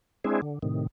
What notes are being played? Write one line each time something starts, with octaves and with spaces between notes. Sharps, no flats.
G#3 C4 D4 E4 G#4
D3
A2 C3 D#3